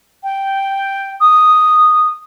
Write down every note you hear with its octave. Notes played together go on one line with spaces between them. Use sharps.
G5
D#6